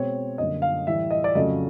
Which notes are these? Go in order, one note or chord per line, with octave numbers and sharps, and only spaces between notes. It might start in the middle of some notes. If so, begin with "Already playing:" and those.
Already playing: B2 G#3 C4 C#5
F#2 D3 G3 A#3 D#5
F5
A2 E3 G3 E5
D#5
D5
F2 C#3 F#3 A3 D#5